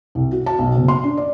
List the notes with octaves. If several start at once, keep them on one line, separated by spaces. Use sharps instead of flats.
C2
F#4
A5
B1
F#1
C6
D4
D5